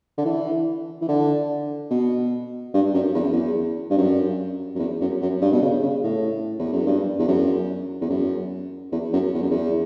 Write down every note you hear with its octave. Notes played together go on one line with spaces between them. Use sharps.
D3
E3
E3
D3
B2
G2
F#2
E2
F#2
E2
G2
F#2
F#2
E2
F#2
F#2
G2
B2
C#3
C#3
A2
E2
F#2
G2
E2
F#2
E2
F#2
E2
F#2
E2
F#2
E2